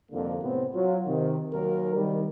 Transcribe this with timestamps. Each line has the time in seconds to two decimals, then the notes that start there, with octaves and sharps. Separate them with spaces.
0.11 C2 F2 D3 A#3
0.42 A2 C3 B3 C4
0.73 F#3 F4
1.05 C3 D#3
1.52 D#2 F#3 A#4
1.95 C2 D#3 G3